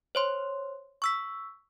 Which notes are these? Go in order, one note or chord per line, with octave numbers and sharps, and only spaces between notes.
C5 C#5 C6
C#6 E6 B6